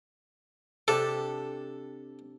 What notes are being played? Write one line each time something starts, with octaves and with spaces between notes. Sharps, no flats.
C3 D4 G4 A4